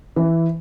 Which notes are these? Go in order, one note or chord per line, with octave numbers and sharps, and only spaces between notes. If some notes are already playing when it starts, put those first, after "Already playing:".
E3